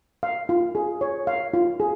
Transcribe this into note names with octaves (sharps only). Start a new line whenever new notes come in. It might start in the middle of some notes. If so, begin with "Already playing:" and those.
F5
F4
G#4
C#5
F5
F4
G#4